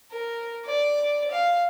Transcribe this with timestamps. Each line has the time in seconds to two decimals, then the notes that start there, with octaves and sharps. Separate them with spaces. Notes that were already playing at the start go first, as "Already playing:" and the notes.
0.12 A#4
0.66 D5
1.31 F5